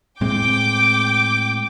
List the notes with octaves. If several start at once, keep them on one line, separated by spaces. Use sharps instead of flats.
A2 G#3 C4 G5 D6